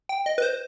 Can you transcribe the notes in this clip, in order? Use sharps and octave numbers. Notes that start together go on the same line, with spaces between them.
G5
D#5
B4
C5